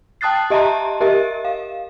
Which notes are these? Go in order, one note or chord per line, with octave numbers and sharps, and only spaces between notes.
G5 A5 D#6 F#6 A6 C7
G4 D#5 E5 A5 A#5 C6
G4 A#4 D#5 E5
F5